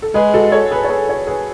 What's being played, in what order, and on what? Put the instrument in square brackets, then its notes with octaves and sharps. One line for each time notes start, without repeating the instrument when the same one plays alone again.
[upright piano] A4
[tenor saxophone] G#3 [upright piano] G#4 B4
[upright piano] F#4 A4
A4 C#5
G#4 B4
C#5
G#4 B4
A4 C#5
G#4 B4